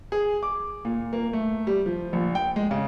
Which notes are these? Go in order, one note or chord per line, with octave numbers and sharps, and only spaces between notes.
G#4
D6
A#2
A#3
A3
G3
F3
A#1
G5
G#3
C#3